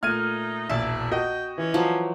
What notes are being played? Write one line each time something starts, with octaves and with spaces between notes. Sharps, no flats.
A#2 A3 D#4 F6 G#6 D#7
E1 A#1 E4 E5 A5
F#4 D#5 G5
E3 C#4
F3 F#3